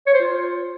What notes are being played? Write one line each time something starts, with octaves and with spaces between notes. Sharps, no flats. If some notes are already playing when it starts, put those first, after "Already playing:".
C#5
C5
F4